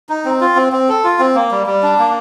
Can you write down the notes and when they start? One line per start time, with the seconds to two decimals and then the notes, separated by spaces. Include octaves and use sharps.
0.09 D#4
0.25 C4
0.41 F4
0.56 C4
0.73 C4
0.89 A4
1.04 F4
1.19 C4
1.35 A#3
1.51 G3
1.67 G3
1.83 D4
1.99 A#3